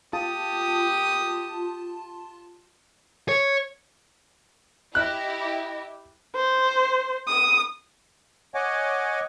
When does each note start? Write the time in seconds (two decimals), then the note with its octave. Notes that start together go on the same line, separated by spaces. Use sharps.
0.13 F4 G4 A5 D#6
3.29 C#5
4.95 E4 G4 D#5 F#6
6.35 C5
7.27 D#6
8.54 C#5 D#5 F#5 G#5 D6